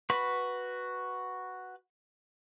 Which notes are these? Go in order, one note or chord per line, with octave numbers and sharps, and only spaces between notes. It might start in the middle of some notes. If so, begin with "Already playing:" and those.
F#4 B4 B5